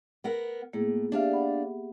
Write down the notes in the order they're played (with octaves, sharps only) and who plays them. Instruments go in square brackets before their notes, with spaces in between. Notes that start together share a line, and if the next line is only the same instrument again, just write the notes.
[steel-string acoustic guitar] B3 A#4 F#5
[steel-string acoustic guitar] A2 [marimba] A#3 B3 G#4
[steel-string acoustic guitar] D4 D5 F5 [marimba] G4 E5
[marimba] F#5 B5